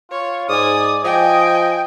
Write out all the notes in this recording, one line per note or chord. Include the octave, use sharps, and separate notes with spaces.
F4 C#5
G#2 D5 G#5 D#6
F3 D#5 G5 G#5